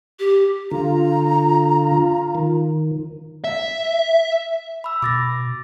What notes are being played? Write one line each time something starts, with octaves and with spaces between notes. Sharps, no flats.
G4
D3 F4 A#5
D#3
E5
B5 E6
B2 D6 A6 A#6